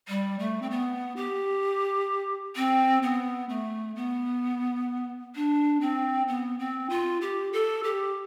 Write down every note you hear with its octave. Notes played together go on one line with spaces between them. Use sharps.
G3
A3
C4
B3
G4
C4
B3
A3
B3
D4
C4
B3
C4
F4
G4
A4
G4